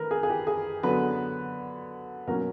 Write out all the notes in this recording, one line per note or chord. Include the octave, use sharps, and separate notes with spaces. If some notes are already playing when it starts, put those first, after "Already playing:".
Already playing: D#3 A3 A#4 B4
G#4
G#4
G4
G#4
D3 F#3 B3 B4
B2 F#3 A#3 C#4 A#4